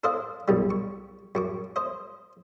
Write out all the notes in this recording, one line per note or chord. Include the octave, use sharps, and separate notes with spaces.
A4 C5 D5 D#5 F5
B1 F#2 G3
C#6
F#2 C#6 D6
C5 D#5